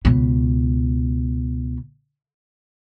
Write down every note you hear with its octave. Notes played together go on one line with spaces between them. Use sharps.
C#2 B2